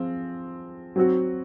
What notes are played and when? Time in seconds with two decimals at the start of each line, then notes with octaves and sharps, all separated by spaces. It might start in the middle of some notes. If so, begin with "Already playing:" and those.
Already playing: F3 C4 F4 G#4
0.96 F#3 C4 F#4